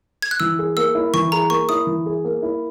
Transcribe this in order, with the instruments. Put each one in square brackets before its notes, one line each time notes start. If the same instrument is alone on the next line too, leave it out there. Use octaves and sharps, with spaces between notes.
[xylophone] G#6
F#6
[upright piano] E3 [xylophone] E6
[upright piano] G#4
[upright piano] A#3 [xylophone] E6
[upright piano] E4
[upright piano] E3 [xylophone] C#6
[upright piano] G#4 [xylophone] A#5
[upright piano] A#3 [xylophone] C#6
[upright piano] E4 [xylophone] D#6
[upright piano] E3
G#4
A#3
E4